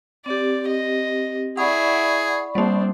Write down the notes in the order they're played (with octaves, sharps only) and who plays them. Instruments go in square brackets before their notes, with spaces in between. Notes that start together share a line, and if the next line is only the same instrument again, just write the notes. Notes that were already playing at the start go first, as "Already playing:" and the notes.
[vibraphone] C4 G4 [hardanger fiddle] D5
[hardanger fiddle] D#5
[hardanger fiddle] E4 [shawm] G#4 [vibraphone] D5 B5 C#6 [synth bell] F#5
[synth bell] G3 A#3 [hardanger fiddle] C4 D4